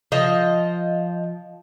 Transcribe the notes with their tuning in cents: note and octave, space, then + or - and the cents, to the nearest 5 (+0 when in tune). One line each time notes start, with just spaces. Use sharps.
F3 +0 D#5 +0